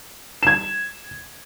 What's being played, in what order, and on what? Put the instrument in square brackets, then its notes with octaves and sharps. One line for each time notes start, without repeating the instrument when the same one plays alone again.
[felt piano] G#6 E7